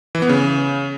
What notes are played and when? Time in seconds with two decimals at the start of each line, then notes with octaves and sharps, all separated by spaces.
0.15 E3
0.22 B3
0.29 C#3